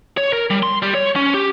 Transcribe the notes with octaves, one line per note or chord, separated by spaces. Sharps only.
C#5
A#4
G3
C6
G3
C#5
C#4
G4